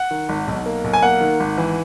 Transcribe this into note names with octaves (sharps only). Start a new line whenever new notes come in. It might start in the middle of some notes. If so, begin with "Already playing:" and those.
Already playing: F#5
D#3
G#1
B1
A#3
B1
G#5
A#3 F#5
D#3
G#1
E3